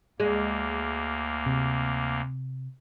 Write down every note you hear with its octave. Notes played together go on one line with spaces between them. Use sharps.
D2 G#3 A#3
C3